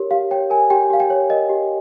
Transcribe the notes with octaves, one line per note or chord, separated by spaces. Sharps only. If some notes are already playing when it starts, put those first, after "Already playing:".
Already playing: G4 A#4 C#5
G4 F5
C#5 G5
A#4 G#5
G4 G5
G4 F5
G5
C#5
A#4 D#5
G4